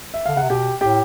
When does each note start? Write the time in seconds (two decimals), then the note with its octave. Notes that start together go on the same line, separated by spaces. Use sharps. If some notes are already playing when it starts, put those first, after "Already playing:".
0.14 E5
0.26 D3 F5
0.35 C#3 F#5
0.42 C3
0.50 B2 G4 G5
0.81 A2 G4 G5